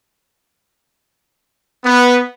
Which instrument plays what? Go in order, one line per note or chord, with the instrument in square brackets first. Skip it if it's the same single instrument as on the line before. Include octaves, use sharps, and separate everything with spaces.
[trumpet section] B3